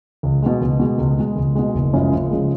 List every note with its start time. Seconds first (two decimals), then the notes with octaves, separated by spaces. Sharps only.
0.23 C#2
0.42 B2 G#3
0.61 C#2
0.80 B2 G#3
0.98 C#2
1.18 B2 G#3
1.36 C#2
1.55 B2 G#3
1.74 F#1
1.93 F#2 C#3 F3 G#3
2.13 F#1
2.31 C#3 F3 G#3